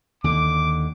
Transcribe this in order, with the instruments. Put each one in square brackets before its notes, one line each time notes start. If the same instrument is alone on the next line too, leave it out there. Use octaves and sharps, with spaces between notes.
[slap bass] D#2 D3 [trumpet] D6